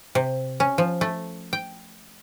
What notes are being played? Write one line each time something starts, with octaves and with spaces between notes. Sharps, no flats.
C3
C#4
F3
A3
G5